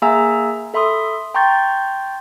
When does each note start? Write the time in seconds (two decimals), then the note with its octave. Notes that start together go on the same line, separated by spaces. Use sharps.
0.02 A#3 G#4 E5 G#5 A#5 E6
0.74 A4 E5 B5 C6 D#6
1.34 G5 A#5 C6 C#6 G6 A6